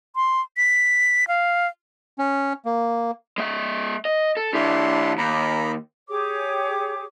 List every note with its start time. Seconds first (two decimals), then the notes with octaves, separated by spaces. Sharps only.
0.16 C6
0.57 B6
1.28 F5
2.19 C#4
2.65 A#3
3.38 G#3 E5
4.05 D#5
4.37 A4
4.54 E3 D4 E4 G4 C6
5.18 D#2 A#5 B5
6.09 G4 G#4 C#5 D6